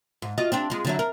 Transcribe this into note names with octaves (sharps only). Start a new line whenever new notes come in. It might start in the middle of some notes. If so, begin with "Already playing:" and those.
G#2
F4 F#4 D#5
C4 D4 G4
G#3 F4
D3 F#3 E4
A#4